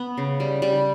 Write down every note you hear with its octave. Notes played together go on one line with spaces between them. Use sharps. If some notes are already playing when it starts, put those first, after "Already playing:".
Already playing: B3
C#3
G3
G3